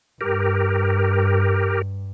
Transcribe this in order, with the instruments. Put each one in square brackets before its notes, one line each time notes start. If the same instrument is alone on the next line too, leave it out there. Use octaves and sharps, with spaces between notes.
[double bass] G2 [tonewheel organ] G4 A#4